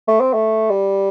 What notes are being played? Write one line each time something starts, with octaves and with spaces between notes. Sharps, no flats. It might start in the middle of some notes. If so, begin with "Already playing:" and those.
A3
C4
A3
G3